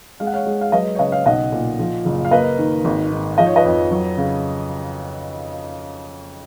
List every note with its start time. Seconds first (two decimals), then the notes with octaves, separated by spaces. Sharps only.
0.20 G#3 F5
0.27 F#5
0.34 C#5 F5
0.46 G#3
0.61 F5
0.72 F#3 B4 D#5
0.95 C#5
0.99 C#3 B4 D#5
1.12 C#5 F5
1.25 B1 D#5 F#5
1.52 A#2
1.79 F3
2.05 F#1
2.25 F5
2.31 A#3 B4 D#5
2.58 D#3
2.84 G#1
3.11 G#2
3.38 F3 D#5
3.46 C#5
3.56 B4 D#5
3.65 F2
3.91 F#3
4.17 C#3